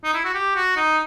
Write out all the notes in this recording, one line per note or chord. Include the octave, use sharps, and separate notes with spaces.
D#4
E4
F#4
G4
F#4
D#4